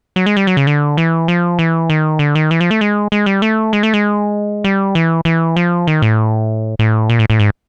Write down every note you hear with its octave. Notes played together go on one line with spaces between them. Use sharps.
F#3
G#3
G3
F#3
C#3
D3
E3
F3
E3
D#3
D3
D#3
E3
F3
A3
G#3
G#3
G3
A3
G#3
A3
G#3
G3
E3
E3
F3
D#3
A2
A2
A#2
A2
A2
G#2